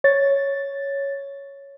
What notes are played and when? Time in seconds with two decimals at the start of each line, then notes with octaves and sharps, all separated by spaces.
0.04 C#5 A6